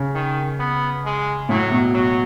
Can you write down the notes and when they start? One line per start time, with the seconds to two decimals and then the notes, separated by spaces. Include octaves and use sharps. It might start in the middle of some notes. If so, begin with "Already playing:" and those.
Already playing: C#3
0.15 D#3
0.59 B3
1.05 G#3
1.49 A2 F#3
1.71 B2
1.93 B2 F#3